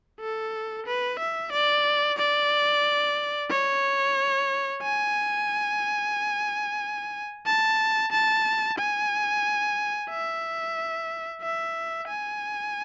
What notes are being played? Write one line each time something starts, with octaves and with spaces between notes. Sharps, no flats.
A4
B4
E5
D5
D5
C#5
G#5
A5
A5
G#5
E5
E5
G#5